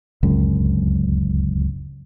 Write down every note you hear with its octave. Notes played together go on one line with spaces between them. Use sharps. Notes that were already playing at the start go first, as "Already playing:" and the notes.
D1 C#2 F#2